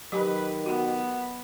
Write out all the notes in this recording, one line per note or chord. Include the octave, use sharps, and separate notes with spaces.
D#3 F#3 G4 B4
B3 F#4